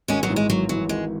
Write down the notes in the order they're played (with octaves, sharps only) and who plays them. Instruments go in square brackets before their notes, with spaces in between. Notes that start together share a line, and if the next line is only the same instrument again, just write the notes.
[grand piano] G#1 [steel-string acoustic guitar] G#3 C#4
[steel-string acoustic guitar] F#3 B3
[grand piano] G#2 E3
[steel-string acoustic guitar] G#3
[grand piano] G#1 [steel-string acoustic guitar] F#3
[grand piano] G#2 E3 [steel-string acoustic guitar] F#3
[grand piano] G#1 [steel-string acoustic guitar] G#3